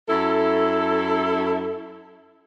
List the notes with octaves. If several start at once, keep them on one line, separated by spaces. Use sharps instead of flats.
F#2 E4 A4